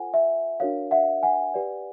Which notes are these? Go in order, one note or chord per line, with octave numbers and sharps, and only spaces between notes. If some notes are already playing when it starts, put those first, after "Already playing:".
Already playing: F4 A4 C5 F#5 G#5
E5
D4 F#4 A#4 C#5 F5
E5 F#5
F#5 G#5
G4 B4 D5